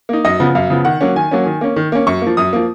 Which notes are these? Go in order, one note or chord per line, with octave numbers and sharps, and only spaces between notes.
A#3 D#4
F#2 D#5
C#3 F3 B3
F#2 F5
C#3 F3 B3
D#3 F#5
F#3 A#3 C#4
D#3 G#5
F#3 A#3 C#4
D#3
A#3 C#4
D#3
A#3 C#4
F#2 C#6
F3 A#3
F#2 D#6
F3 A#3